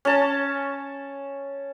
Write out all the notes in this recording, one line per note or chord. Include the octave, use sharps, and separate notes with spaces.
C#4 A5